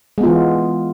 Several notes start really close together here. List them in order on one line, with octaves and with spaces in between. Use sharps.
G#3 B3 F4 E3